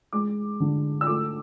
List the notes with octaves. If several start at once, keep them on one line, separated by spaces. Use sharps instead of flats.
G#3 D6
D3
E6
A3 D6